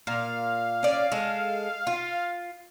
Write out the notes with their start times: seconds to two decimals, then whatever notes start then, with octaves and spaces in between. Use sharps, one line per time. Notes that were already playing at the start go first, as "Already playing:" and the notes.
0.07 A#2 F5
0.83 C#4 D5
1.12 G#3 A4
1.87 F4